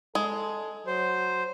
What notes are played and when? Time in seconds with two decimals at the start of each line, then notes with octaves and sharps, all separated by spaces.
0.15 G#3 A4
0.87 F#3 C5